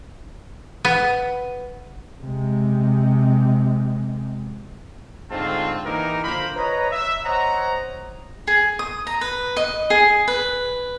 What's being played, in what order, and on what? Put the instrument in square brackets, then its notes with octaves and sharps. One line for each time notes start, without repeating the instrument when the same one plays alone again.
[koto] B3
[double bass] C3 G#3
[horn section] G#2 D3 A3 C4 F4 A5
E3 A#3 D#4 E4 G4 A#4
D3 F3 A#3 A#4 C5 B5
B4 C#5 D#5 A#5
E5
C5 C#5 D#5 F#5 A#5
[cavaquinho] G#4
D#6
A#5
B4
D#5
G#4
B4